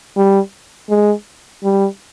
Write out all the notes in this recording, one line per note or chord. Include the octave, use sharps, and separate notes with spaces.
G3
G#3
G3